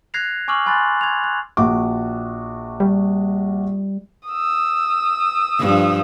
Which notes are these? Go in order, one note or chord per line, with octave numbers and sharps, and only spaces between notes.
F#6 G#6 A#6 C7 F7
G#5 C#6 D6 E6 F6 F#7
G#5 B5 C6 F#6 A6
G#6 F7
F#6
A#1 F#4 D6
G3
D#6 E6
G2 F3